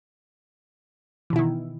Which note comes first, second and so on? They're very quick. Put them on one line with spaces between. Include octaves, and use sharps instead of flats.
E3 B2 E4 D#3